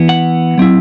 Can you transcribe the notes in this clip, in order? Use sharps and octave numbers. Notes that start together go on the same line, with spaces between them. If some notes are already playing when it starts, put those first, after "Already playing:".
Already playing: E3 B3 E4
F#5
F#3 C4 E4